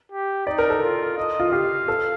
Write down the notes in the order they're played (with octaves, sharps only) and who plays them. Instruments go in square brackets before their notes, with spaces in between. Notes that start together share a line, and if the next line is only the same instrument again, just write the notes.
[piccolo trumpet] G4
[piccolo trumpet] D#4 [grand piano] D5
[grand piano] A#4
A4
[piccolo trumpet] F4
D#5
[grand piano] F4
[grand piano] G4 [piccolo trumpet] F5
[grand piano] A4